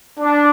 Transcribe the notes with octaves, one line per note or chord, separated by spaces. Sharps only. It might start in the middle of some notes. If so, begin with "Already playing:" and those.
D4